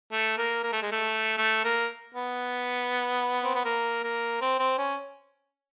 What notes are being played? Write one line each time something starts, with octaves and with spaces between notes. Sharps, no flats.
A3
A#3
A#3
A3
G#3
A3
A3
A#3
B3
C4
B3
A#3
A#3
C4
C4
C#4